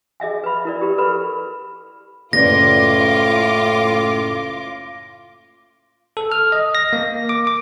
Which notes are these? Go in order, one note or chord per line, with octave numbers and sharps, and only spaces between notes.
G#4 D#5 E5 G#5
B4 B5
E4 A#4 D5
G4 A#4
A4 B4 B5
F#1 A2 F4 B4 D5 D6 A#6
A4
F6
D#5
A#6
A#3
D6
D6